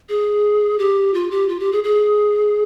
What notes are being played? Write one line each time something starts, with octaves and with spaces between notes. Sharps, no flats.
G#4
G4
F4
G4
F4
G4
G#4
G#4